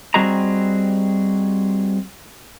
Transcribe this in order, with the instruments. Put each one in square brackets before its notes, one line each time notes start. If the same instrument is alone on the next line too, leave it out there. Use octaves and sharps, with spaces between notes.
[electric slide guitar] G3 C4 F#4 G#4 D#5 A#5